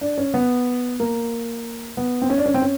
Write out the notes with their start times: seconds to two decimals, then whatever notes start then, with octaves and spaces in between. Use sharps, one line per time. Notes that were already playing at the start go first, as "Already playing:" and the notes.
0.01 D4
0.18 C#4
0.34 B3
1.00 A#3
1.97 B3
2.22 C4
2.30 C#4
2.38 D4
2.46 C#4
2.54 C4
2.62 C#4